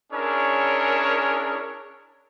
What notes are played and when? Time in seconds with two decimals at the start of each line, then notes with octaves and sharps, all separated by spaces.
0.12 C#4 D4 E4 G#4 A#4 C#5